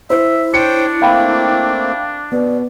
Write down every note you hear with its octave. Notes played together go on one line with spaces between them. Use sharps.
E4 C5 E5
D4 C5 C#5 G5 C#7
A3 A#3 C4 F5 G5 B5
B2 B3 D5